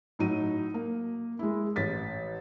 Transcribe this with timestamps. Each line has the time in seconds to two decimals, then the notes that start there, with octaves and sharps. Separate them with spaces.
0.19 A2 F#3 D#4 D#7
0.74 A#3
1.39 G#3 E4
1.76 A1 A6 B6